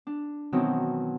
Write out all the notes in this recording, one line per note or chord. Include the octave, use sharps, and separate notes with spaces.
D4
B2 D#3 E3 F#3 C4 D#4